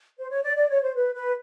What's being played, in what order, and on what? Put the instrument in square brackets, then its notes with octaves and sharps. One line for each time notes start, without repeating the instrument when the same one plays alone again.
[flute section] C5
C#5
D5
D5
C#5
C5
B4
B4